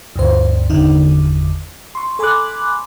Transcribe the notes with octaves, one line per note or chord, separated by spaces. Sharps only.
D2 G2 C5
G1 E2 D3 D#3 D#4
C6 C#6
A4 G#5 B5 C6 D6 F#6